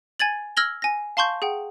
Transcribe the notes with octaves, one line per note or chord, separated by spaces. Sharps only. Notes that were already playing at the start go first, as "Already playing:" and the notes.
G#5 G#6 A6 F#7
E6 F6 G#6 A#6 F#7 G7
G#5 A#6
F5 A5 C6 C#6 G6
G#4 F#5 G5